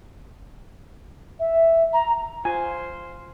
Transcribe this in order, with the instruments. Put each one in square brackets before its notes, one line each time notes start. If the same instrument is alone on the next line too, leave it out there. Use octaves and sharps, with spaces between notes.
[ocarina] E5
A#5
[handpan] F4 [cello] C5 [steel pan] G#5